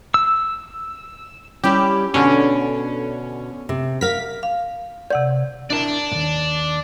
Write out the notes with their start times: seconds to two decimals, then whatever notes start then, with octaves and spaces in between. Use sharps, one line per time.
0.14 E6
1.64 G3 C#4 E4 G4
2.14 B2 D3 C#4
3.69 C3
4.01 A#4 F5 B6
4.43 F5
5.10 C3 D5 F#5 G6
5.70 D4 E4 A#4 D5 A5
6.12 D#2 G#2